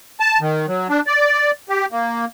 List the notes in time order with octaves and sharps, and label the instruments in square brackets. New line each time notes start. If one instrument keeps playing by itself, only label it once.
[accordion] A5
D#3
F#3
D4
D5
G4
A#3